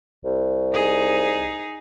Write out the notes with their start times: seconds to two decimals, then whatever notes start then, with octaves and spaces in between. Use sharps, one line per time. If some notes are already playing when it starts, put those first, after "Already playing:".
0.24 C2
0.73 D#4 G#4